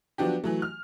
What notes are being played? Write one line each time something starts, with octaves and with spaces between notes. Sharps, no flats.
F3 F#3 B3 D4 F#4 G4
E3 F#3 A3
F6